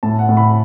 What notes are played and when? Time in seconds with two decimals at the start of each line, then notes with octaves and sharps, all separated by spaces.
0.03 A2 A5
0.19 F#5
0.29 A2
0.37 B5